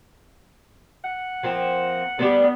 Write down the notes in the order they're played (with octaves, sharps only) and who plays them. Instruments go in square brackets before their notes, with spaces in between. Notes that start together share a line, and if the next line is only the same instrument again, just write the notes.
[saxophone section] F#5
[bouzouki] F3 A#3 C4
[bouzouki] G3 G#3 D4 [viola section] B3